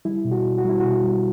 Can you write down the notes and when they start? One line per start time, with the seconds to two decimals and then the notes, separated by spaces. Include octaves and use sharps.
0.05 G3 E4
0.25 B2
0.31 F#4
0.45 B2
0.58 F#4
0.65 G3 E4
0.80 B2 F#4
1.04 G3